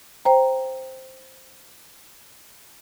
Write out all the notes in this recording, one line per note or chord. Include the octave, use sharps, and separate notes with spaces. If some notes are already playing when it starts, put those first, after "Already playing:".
C5 G5 A#5